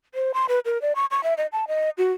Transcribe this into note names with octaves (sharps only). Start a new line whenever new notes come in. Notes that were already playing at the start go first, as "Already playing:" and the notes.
C5
C6
B4
A#4
D5
C#6
C#6
E5
D#5
A5
D#5
F#4